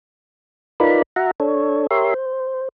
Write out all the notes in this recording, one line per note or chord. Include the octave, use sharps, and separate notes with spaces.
D#4 F4 A#4 B4 D5 B5
F#4 E5 F#5 A#5
D4 A4 C#5
G4 A#4 C#5 E5 C6
C5